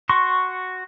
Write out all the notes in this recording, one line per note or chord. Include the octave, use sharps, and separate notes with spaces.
F#4 C6 C#6